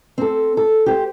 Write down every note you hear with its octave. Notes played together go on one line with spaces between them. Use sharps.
C4 A4
A4
G4 C5